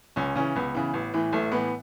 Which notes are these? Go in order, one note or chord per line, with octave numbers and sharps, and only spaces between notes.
C#2 C#4
C#3 E3 C#4
C#2 B3
C#3 E3
A1
A2 E3
A1 A3
A2 E3 B3